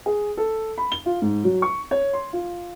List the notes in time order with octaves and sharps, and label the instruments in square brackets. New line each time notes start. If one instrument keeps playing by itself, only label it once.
[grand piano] G#4
A4
B5
G7
F4
G#2
F#3
C#6
C#5
C6
F4